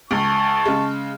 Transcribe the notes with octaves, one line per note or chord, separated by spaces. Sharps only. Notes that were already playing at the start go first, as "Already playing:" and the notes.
C#2 A5 C#6
C#3 G#3